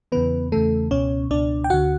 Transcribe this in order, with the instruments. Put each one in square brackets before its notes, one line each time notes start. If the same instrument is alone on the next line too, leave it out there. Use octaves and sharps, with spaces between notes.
[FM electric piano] E2 C#3 E3 B3 B4
E2 C#3 E3 A3 A4
C#2 B2 C#4 C#5
C#2 B2 D4 D5
G5
D2 D3 F#4 F#5